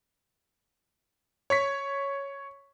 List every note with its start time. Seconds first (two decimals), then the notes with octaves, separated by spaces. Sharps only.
1.50 C#5 C#6 B6